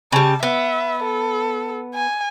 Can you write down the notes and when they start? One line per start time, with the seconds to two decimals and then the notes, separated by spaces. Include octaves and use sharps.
0.12 C#3 G3 A5
0.43 B3 E5
1.05 A4
1.94 G#5